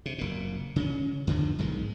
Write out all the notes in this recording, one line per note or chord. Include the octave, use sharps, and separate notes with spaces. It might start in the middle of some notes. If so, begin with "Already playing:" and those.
C3
F#1 A#2
C#3 C#4
F2 D3 D#3 F3
B1 G#2 D#3 G#3